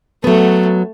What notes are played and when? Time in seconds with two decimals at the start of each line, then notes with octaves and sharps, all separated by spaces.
0.24 F#3 A3 B3